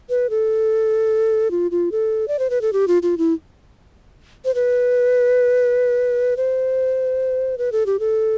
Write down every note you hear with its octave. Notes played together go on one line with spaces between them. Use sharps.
B4
A4
F4
F4
A4
D5
C5
B4
A4
G4
F4
F4
E4
C5
B4
C5
B4
A4
G4
A4